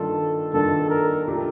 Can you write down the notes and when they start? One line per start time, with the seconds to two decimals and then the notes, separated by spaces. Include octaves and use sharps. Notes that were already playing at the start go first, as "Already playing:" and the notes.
Already playing: G2 D#3 A#3 D4 F4 A4
0.53 G2 D#3 A#3 D4 F4 A4
0.90 A#4
1.27 A#2 A3 D4 G4